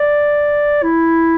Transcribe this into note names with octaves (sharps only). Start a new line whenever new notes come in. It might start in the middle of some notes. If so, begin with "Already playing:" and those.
Already playing: D5
E4